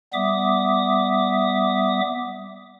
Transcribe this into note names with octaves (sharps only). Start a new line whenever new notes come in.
G3 B3 E5 D6 D#6